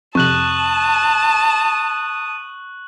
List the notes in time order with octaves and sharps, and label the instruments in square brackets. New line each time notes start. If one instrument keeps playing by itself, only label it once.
[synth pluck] F2 C3 [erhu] A5 [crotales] C#6 F#6 F#7 [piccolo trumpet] D#6